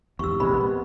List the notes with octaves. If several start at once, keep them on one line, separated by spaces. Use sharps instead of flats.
E2 G#2 G4 C#6 E6
A#1 C3 G#3 B5
B3